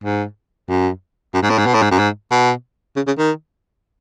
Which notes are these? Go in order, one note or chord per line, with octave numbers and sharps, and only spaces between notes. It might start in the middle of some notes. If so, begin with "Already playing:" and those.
G#2
F#2
F#2
G#2
A2
G#2
B2
A2
G#2
F#2
G#2
B2
C#3
C#3
D#3